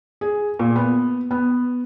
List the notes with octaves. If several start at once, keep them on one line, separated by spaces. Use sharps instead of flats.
G#4
A#2
B3
B3